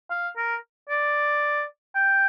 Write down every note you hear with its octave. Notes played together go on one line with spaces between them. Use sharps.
F5
A#4
D5
G5